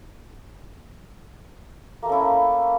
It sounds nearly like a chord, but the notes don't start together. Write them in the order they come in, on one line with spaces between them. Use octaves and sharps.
A#3 A3 C#4 E4